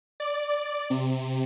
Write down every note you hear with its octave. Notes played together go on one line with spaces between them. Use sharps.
D5
C3